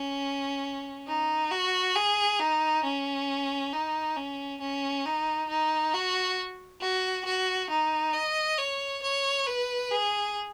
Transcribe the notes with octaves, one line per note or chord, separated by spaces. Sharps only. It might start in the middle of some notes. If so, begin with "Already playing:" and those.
Already playing: C#4
D#4
F#4
G#4
D#4
C#4
D#4
C#4
C#4
D#4
D#4
F#4
F#4
F#4
D#4
D#5
C#5
C#5
B4
G#4